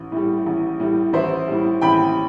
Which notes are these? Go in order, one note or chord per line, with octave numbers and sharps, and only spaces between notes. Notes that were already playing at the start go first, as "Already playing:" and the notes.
Already playing: A1
A2 G3
A1
A2 G3
A1 C5 E5
A2 G3
A1 G5 B5